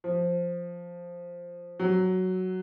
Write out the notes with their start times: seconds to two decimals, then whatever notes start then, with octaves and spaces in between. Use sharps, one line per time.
0.04 F3
1.80 F#3